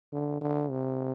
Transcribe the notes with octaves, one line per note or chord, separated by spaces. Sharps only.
D3
D3
C3